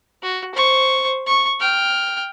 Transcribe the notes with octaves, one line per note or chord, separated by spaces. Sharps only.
F#4
C5 C#6
C#6
G5 F6